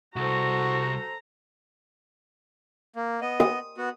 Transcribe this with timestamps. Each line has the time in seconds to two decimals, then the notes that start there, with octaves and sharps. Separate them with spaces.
0.16 C2 F#4 A4 C5 A#5
2.96 A#3
3.21 B3 D#5
3.40 D#6
3.78 B3 F#4